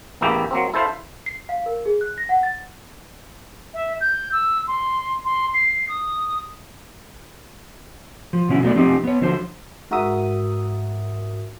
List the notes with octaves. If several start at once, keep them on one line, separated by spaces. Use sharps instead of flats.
A1 E2 A#3 E4 G4
F#3 A#3 C4
E4 A4 C5 E5 F5
C7
F5
A#4
G#4
F#6
A#6
F#5
A6
E5
G6
E6
C6
C6
C7
D#6
F3
B2 D3 C#4 E4
F#3 A3 B3 D5
F3 C4 D#4 G4
B3 C#5
D3 F3 F#3 C5
G#2 F#4 A#4 E5 D#6